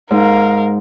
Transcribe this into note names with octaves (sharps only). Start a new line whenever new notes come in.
G#2 D#4 A#4 F5